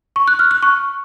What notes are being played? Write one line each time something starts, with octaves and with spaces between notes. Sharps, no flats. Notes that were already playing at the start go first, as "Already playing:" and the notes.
C#6
F#6
F6
F#6
C#6